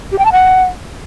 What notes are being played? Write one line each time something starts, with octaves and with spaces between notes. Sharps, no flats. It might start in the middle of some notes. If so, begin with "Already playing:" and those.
G4
G5
A5
F#5